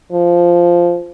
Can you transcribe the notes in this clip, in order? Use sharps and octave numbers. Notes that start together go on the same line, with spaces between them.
F3